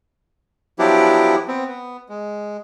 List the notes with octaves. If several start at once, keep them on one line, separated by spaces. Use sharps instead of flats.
F3 F#3 B3 D4 E4 G4
B3 C4
B3
G#3